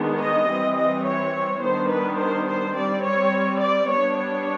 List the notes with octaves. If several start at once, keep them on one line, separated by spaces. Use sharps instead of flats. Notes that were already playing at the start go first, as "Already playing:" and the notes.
Already playing: D#3 G#3 B3 D4
D#5
E3 G3 C4
D#5
C#5
D#3 G3 B3 D4 C5
B4
C5
C5
G3 C4 D5
C#5
D5
G3 B3 D4 C#5
C#5